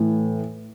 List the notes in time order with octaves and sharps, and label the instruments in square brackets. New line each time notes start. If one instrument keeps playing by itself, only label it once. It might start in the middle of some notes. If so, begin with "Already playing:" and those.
Already playing: [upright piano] A2 E3